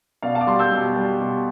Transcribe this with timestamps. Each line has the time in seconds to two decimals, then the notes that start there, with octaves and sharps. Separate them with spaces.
0.22 B2 D5 F5
0.35 F5 A5
0.41 D6
0.47 G3 A5 C6
0.59 E6 G6
0.72 B2
0.96 G3
1.20 B2